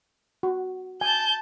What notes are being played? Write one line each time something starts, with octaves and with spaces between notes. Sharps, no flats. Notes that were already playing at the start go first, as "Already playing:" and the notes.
F#4
G#5 A5 G6